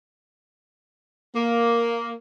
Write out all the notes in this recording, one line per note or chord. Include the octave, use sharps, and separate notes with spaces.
A#3